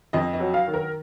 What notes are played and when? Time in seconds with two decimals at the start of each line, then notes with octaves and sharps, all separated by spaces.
0.13 F2 D#5
0.33 D#5
0.40 F#3
0.54 F5
0.67 D#3
0.74 A#4